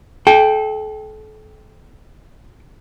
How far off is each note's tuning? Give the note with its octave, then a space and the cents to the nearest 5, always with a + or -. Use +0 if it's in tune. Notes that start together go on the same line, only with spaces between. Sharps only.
A4 -35 G5 +0